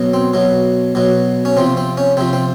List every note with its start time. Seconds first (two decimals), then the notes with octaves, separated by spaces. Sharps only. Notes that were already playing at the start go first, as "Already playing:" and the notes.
Already playing: B2 F#3
0.13 C4
0.34 B2 F#3
0.95 B2 F#3
1.45 C#4
1.57 C3 F3 C4
1.77 C4
1.97 C#4
2.17 C3 F3 C4
2.33 C4